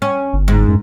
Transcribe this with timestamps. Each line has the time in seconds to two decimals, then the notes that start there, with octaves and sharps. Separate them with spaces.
0.02 C#4
0.33 G1
0.48 G#2
0.68 F#2